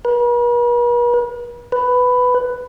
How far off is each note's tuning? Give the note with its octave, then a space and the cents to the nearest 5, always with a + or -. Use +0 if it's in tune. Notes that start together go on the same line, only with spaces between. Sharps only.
B4 -45
B4 +10